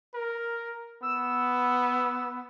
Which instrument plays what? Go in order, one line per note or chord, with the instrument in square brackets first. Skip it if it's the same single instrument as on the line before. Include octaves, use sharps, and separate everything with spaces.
[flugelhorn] A#4
[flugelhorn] B3 [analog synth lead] E6